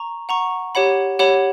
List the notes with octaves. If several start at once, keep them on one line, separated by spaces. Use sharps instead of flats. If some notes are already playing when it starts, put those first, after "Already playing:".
Already playing: A#5 C#6
F#5 A#5 C#6
G4 C#5 F#5 B5
G4 C#5 F#5 B5